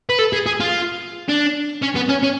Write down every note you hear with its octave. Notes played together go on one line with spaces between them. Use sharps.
B4
A4
G#4
G#4
F4
D4
C#4
B3
C#4
C#4